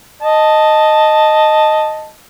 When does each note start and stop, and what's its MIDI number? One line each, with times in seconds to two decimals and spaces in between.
0.22 2.10 75
0.22 2.10 81